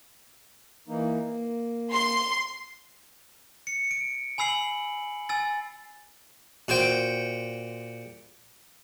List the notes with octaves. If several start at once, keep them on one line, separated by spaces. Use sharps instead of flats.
E3 A#3 D#4
A#3
C6
C#7
D7
G#5 B5 E6 C7 F#7
G#5 E6 A6
A#2 F#4 C5 G5